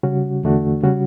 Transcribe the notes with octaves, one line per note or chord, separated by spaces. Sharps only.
C#3 G3 C#4 F#4
E2 D3 A3 D4 F#4
C#3 G3 C#4 F#4